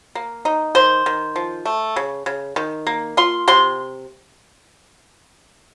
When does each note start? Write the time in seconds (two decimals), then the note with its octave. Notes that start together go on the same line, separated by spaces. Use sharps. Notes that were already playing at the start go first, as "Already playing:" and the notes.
0.15 A#3
0.45 D#4
0.75 D#3 C5
1.06 D#3
1.36 F3
1.66 A3
1.96 C#3
2.26 C#3
2.56 D#3
2.87 A#3
3.17 F4 C6
3.48 C3 C6